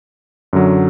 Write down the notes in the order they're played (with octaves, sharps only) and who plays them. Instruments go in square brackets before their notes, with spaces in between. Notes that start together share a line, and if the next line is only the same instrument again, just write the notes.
[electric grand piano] F#2 D3 F#3